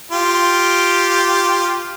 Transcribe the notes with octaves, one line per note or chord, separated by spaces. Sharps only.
F4 G4